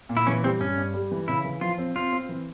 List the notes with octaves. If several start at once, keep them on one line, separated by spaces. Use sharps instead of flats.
A#2
E4
E3 C#4
G3 C4
G2 C#4
G2
G3
E3
C#3 E4
E3
F3 F4
C4
C4 F4
C4
E3